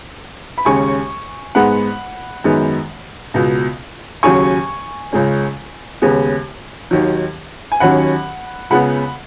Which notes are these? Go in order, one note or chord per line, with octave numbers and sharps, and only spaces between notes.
B5
D#2 C#3 G#3 C#4 G#5 C#6
G#2 G#3 B3 F#5 B5
F#2 D#3 G#3 B3
C#2 B2 B3
D#2 C#3 F#3 C#4 G#5 C#6
C#2 C#3 G#3 C#4
D#2 C#3 G#3 B3
D#2 D#3 F#3
G#5
D#2 D#3 F#3 C#4 F#5 B5
C#2 C#3 B3 F#5 B5